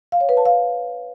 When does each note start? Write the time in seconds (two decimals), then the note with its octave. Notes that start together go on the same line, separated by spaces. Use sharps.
0.12 F5
0.21 C#5
0.29 B4
0.37 A5
0.45 F5